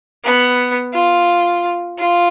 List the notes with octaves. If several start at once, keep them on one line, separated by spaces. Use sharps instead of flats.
B3
F4
F4